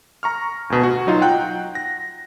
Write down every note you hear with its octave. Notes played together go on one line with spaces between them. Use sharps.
A#5 C#6 F6
D2 B2
F#4
F#3 D#4 F4
F#5 G5 F#6
A#6